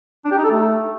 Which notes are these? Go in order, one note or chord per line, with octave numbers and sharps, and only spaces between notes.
D4
G4
D#4
A4
A3